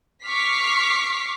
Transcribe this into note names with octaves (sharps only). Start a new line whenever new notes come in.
C#6 D6 F6 B6 C7